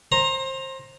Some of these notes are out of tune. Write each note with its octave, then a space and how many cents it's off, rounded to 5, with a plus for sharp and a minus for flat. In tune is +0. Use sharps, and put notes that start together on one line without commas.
C5 +25 A#5 +0